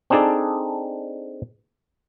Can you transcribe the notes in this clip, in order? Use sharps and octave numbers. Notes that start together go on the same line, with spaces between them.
C4 D4 D#4 G#4 A4 D5